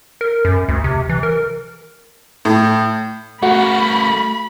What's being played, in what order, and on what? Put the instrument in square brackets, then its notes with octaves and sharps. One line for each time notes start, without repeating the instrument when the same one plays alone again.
[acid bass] A#4
F#2
D2
C3
E3
A#4
[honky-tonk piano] A2
[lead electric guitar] A3 A#4 [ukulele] F#4 F#5 [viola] B5